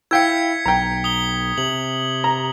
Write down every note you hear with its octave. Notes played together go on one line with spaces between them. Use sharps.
E4 F5 G5 E6 G#6 B6 C#7
B1 G5 A#5
D#6 G7
C3 F#7
A#5